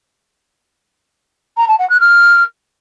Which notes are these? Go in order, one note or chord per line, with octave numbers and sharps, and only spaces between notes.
A#5
A5
F#5
F#6
F6